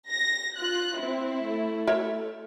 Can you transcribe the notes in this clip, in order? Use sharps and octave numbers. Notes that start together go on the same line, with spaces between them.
A#6
F4 F#6
C4 E4
A3
A#4 C#5 E5